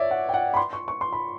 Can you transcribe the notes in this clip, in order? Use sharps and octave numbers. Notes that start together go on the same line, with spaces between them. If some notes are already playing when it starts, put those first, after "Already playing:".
Already playing: C#5 D5 E5
F#5
G5
F#5
B5
C6
C#6
C#6
C6
B5